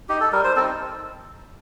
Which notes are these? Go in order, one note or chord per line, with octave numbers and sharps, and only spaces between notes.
D#4 G4
A4
G3 A#4
C5
C4 D#4 A4